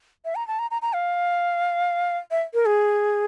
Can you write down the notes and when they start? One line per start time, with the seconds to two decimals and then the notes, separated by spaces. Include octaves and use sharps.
0.25 E5
0.36 A#5
0.48 A5
0.59 A#5
0.71 A#5
0.82 A#5
0.93 F5
2.31 E5
2.54 A#4
2.66 G#4